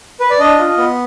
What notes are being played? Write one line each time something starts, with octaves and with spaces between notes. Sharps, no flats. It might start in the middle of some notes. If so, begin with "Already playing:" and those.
B4
D5
D4 D#5
F4
B3